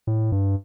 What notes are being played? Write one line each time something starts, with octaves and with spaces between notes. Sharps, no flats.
A2
G2